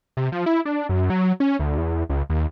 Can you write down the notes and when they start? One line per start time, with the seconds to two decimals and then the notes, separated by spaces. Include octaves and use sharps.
0.17 C3
0.32 F3
0.46 E4
0.65 D4
0.89 F#2
1.10 F#3
1.40 C#4
1.60 D2
1.78 E2
2.09 C#2
2.30 D#2